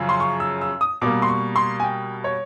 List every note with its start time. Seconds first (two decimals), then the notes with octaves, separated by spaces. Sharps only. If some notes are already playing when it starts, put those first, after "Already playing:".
Already playing: F#2 C#3 F3
0.09 C6
0.20 C#6
0.40 E6
0.61 E6
0.81 D#6
1.02 B2 G3 A#3 D6
1.22 C6
1.28 C#6
1.56 C6
1.80 G#5
1.84 G5
2.24 C#5